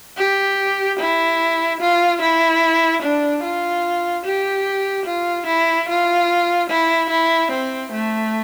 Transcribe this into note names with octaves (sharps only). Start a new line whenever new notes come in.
G4
E4
F4
E4
D4
F4
G4
F4
E4
F4
E4
E4
C4
A3